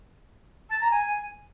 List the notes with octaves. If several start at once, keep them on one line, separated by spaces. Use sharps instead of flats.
A5
A#5
G#5